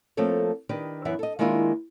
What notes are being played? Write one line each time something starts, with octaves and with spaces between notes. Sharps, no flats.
F3 A3 A#3 C4 A4 C#5
D#3 D4 G4 B4
F#2 E3 B3 E5 F#5
A4 D#5
D#3 G#3 A#3 D4 E4 F4